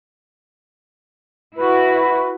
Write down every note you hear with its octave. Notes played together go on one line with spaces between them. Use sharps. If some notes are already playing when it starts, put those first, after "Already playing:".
E4 F#4 B4